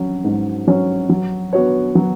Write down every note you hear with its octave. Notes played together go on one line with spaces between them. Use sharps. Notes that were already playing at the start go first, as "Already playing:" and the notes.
Already playing: F#3 C#4
G#2
F#3 C#4
F#3
B3 F#4 C#5
F#3